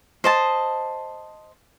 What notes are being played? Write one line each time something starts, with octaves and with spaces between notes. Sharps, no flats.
C5 D#5 A5